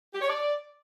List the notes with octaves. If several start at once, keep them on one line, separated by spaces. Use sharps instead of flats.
G4
C#5
D5